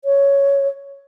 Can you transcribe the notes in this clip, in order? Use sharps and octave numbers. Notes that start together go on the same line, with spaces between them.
C#5